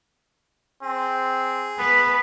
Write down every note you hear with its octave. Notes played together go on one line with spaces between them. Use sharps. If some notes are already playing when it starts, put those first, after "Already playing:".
C4 G#4
B3 B4